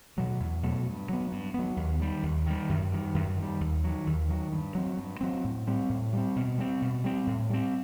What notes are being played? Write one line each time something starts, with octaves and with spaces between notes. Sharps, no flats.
B2 F#3 A3
E2
B2 F#3 A3
G2
F#3 B3
G2
F#3 B3
D#2
D#3 G3
D#2
D#3 G3
F#2
D#3 G3
F#2
D#3
G3
D#2
D#3 F#3
D#2
D#3 F#3
G2
F#3 C4
G2
F#3 C4
A2
G3 C4
A2
G3 C4
B2
G3 C4
B2
G3 C4
A2
G3 C4